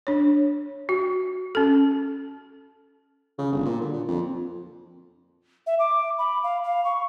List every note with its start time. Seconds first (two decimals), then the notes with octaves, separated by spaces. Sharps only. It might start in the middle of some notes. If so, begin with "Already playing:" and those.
0.07 D4 C#5
0.89 F#4
1.55 C#4 A4
3.38 C#3
3.52 G1
3.65 A#2
3.81 D3
3.93 A#2
4.08 F2
5.66 E5
5.79 D6
6.18 B5
6.43 F5
6.64 F5
6.85 C#6